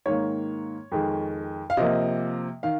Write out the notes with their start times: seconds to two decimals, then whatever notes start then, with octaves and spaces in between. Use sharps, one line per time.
0.06 G#2 D#3 A#3 C#5
0.92 F2 D#3 G#3
1.70 F5
1.77 C3 F3 A#3 D#5
2.63 D#3 F5